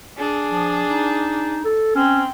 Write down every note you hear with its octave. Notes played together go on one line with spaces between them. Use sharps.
D4 G#4
F3
D#4
A4
C4 C#4